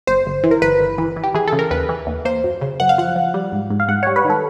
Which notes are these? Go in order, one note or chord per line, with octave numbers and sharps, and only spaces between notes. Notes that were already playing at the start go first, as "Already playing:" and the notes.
G1 C5
G1
E3
A#4
G1 B4
G1
E3
E3
G4
E3 G#4
C#3 A4
A#4
D#2 B4
E3
D#2
A#3 C5
F#2
C#3
F#2 F#5
F5
F3 F#5
F3
G3
G#2
G#2
F5
G#2 F#5
C#5
G3
B4
D#3 A4